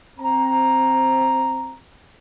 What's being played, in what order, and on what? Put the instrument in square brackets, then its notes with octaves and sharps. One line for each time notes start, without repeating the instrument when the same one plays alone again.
[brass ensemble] C4 A#5